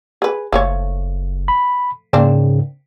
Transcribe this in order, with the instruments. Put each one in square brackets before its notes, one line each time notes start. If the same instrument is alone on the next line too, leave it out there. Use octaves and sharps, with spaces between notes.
[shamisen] G#4 B4
[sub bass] F#1 [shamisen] F3 A3 C#5
[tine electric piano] B5
[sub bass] G#2 [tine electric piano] C#3 [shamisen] A#3 C4 D4